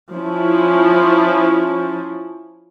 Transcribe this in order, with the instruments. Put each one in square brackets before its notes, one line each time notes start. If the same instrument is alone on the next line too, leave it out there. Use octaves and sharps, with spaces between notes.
[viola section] F3 C#4 E4